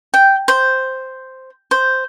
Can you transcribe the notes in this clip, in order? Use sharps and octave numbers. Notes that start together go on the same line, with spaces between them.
G5
C5
C5